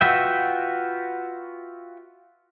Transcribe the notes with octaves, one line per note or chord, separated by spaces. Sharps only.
F4 F#4 B4 E5 G5